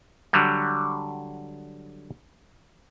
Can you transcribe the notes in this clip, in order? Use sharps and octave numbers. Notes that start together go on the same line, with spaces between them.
D3 F#3 G3